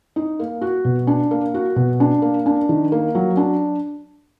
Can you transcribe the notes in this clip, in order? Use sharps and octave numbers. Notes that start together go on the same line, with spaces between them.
D#4
A#3
F#4
B2
D4
A#3
F#4
B2
D4
A#3
D4
D#3
A#3
F#3
D4